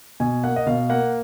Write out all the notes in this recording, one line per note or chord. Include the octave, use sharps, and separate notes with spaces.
B2 G#5
A#3 F#5
D#5
B2 F5
A#3 F#5